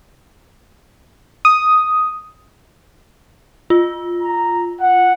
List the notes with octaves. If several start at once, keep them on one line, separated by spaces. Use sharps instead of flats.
D#6
F4
A#5
F#5